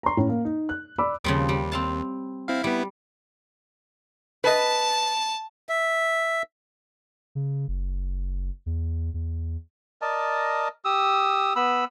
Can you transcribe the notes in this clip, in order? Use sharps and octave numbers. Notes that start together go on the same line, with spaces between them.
A#5 C6
A2 C#4
A#3
D#4
F#6
D5 B5 D6 E6
D#2 C#3 F3 G3
G3
C4 F5 A5
C4 E4 F5
G3 B3 E4
B4 D#5 A5
E5
C#3
F#1
E2
E2
A#4 D5 D#5 A5
G4 D#6 E6
B3 B5 E6